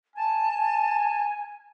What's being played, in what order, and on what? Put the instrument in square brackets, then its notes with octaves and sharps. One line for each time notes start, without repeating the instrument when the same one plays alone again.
[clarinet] G#5 [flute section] A5